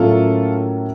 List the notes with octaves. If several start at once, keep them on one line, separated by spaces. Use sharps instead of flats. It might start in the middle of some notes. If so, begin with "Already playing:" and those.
Already playing: A2 F#3 A#3 C#4 F4 A4